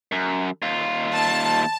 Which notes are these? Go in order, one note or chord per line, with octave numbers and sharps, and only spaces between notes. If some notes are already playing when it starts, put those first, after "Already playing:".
F#2
D#2 F4
A5